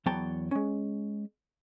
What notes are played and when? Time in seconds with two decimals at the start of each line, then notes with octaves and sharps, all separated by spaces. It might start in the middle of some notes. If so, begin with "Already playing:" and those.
0.06 E2 F#3 B3 C#5 G5 A5
0.51 G#3 C#4